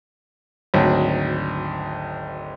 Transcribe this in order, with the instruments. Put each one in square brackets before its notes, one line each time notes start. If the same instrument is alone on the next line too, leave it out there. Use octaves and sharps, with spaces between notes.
[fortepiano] G#1 D2 F#3